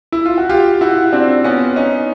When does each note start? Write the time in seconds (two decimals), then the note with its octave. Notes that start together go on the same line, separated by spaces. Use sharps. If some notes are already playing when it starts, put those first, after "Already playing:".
0.12 E4
0.25 F4
0.38 F#4
0.49 F4 G4
0.81 E4 F#4
1.12 C4 D4
1.44 B3 C#4
1.76 C#4 D#4